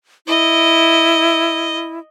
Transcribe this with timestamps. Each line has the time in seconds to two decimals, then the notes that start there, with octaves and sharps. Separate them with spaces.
0.27 E4 D#5